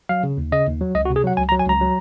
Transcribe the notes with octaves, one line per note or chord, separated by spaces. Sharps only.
F#3 F5
C#3
D#2
C#3 D#5
D#2
F#3
C#2 D#5
F#4
C3
G#4
F#3 F#5
C#2 G#5
A#5
F#3
G#5
C#2 A#5
F#3